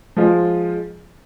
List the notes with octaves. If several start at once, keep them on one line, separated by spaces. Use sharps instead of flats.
F3 G#3 F4